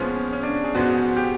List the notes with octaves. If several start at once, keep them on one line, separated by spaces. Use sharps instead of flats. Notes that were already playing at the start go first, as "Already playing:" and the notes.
Already playing: A#2 F3 G#3 B3 C#4
C#4
D4
G#4
G#2 F3 G#3 B3 F#4
G4